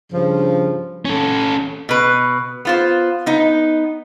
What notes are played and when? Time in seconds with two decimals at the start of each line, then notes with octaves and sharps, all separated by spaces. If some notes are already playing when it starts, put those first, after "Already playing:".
0.12 G2 C#3 F3
1.05 C#4 A4
1.89 B2 B4
2.65 B3 F4 C5
3.26 B3 D#4